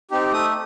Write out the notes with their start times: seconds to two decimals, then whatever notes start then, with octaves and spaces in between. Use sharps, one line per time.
0.11 C4 D#4 G4
0.32 A3 D#6